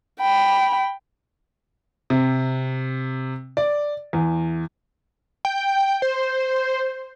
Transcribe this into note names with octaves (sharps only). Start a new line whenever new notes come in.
G5 B5
C3
D5
E2
G5
C5